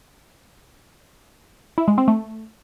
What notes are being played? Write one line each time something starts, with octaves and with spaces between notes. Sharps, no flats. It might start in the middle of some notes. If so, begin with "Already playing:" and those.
E4
G#3
C4
A3